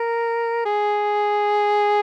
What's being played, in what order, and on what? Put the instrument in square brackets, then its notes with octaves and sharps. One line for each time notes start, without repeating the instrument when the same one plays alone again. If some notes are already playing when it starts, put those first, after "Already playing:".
Already playing: [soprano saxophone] A#4
G#4